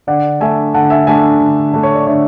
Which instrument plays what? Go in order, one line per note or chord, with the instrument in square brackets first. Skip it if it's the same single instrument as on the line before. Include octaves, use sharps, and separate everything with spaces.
[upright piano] D3 D5 F#5
A3 D4 E5 G#5
D3 F#5 A5
E5 G#5
A3 D4 E5 G#5
D3
A3 D4
C#5
D5
D3 C#5 E5